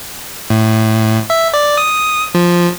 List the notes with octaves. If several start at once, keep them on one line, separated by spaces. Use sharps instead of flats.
A2
E5
D5
D#6
F3